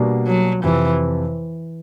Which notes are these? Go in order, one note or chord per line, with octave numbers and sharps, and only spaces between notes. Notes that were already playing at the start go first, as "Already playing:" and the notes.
Already playing: B2 G3 A#3 D4 F#4
F#3
F2 C3 E3 F3